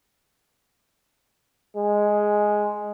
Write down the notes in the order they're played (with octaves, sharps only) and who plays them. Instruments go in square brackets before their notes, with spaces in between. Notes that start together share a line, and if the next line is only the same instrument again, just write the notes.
[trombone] G#3